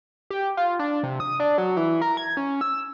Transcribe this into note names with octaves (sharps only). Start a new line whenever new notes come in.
G4
F4
D4
C3
D#6
D4
F#3
E3
A#4
G#6
C#4
E6